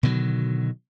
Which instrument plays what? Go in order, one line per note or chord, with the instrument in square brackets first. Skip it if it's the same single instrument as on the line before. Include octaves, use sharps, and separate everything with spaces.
[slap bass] B2 D3 D#3 F#3